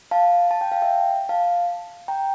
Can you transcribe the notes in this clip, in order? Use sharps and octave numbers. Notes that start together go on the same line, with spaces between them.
F5 A5
A5
G5
F5
E5 G5
F5 A5
G5 A#5